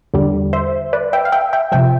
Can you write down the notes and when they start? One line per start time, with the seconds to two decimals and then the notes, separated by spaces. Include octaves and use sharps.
0.14 E2 D3 G3
0.53 C5 E5
0.93 B4 D5
1.13 E5 G5
1.25 F5
1.32 E5 G5
1.53 E5 G5
1.72 C3 F3 E5 G5